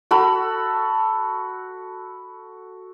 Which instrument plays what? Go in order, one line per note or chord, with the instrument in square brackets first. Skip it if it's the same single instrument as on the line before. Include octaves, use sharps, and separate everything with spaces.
[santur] F#4 A4 B5